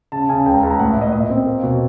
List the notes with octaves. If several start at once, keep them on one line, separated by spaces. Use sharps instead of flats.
C#3 A5
C#3 G#5
C#2 G5
A#5
C#2 A5
A#5
A2 F#5
E5
A2
D#5
A#2 D#5
C4
A#3
B2